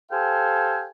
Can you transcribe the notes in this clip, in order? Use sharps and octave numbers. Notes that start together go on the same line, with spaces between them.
G4 A4 C5 F5 G5 G#5